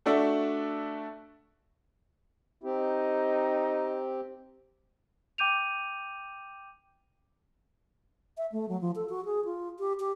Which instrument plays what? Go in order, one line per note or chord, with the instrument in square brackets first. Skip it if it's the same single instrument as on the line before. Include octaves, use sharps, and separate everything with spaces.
[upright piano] A3 D4 F#4 A4 D5 E5
[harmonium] C4 G4 [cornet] D#4
[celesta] G5 D6 G6 D#7 F7
[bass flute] E5
A3
F#3
F3
A4
F#4
G#4
F4
G4
G4